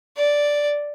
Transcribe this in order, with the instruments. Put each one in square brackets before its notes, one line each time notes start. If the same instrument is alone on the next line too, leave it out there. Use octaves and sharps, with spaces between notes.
[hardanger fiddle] D5